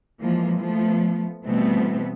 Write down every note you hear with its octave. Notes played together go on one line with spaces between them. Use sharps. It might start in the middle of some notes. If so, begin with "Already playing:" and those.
E3 F3 G#3 A#3
F3 A3 B3
B2 E3 G3 A3 B3 C4